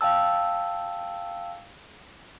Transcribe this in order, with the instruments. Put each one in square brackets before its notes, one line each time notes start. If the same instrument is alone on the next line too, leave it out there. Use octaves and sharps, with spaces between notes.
[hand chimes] F5 G5 A5 E6